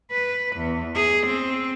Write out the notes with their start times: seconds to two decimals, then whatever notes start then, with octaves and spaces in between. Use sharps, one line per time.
0.11 B4
0.56 E2
0.95 G#4
1.27 C4